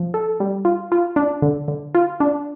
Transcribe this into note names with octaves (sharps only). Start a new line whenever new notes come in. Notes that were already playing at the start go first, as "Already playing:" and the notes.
Already playing: F3
A4
G3
F4
F4
D4
D3
D3
F4
D4